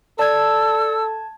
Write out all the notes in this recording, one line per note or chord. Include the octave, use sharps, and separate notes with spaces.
A4 D5 A5 E6 G#6